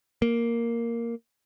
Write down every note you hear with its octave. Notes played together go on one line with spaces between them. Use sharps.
A#3